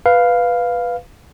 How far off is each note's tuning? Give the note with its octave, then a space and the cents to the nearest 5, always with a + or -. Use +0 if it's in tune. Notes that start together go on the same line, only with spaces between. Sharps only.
B4 +0 F5 +0